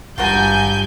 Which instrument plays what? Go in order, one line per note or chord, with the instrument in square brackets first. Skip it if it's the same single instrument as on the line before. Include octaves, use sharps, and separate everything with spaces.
[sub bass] G#1 [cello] G2 [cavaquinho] F4 F#4 A#4 [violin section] G#5 G6